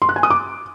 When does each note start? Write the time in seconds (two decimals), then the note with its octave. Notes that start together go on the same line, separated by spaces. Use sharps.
0.02 C6
0.09 F#6
0.16 G#5
0.23 D#6
0.30 D6